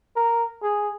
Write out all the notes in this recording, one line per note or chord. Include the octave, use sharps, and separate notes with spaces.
A#4
G#4